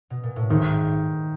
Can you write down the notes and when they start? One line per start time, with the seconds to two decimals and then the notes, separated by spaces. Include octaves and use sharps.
0.10 B2
0.23 A#2
0.36 A2
0.50 G#1 G#2 D#3